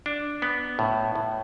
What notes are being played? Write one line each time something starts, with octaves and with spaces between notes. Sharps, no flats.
D4
B3
A2
A2